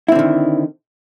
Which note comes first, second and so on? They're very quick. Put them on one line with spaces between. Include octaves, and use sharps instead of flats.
E4 C4 D3 D#3